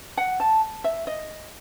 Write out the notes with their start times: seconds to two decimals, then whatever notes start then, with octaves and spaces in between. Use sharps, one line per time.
0.17 F#5
0.40 A5
0.84 E5
1.07 D#5